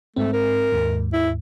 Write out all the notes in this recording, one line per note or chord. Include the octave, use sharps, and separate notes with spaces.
G#2 A3 C4
A#4
D#2 G#2
E4